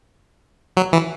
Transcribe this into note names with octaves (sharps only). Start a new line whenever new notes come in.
F#3
E3